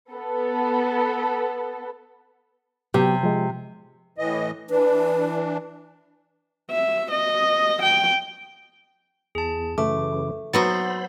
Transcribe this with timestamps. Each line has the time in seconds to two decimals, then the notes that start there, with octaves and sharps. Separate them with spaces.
0.13 B3 A4
2.94 C3 F#3 B3 G4
3.23 F3 G#3
4.18 A2 E3 D#5
4.70 E3 D4 B4
6.71 E5
7.11 D#5
7.82 G5
9.35 E2 G#4 A5
9.78 F#2 C#3 E3 A3 D6
10.53 F#3 B3 F#4 C5 B5 C6 E6 A6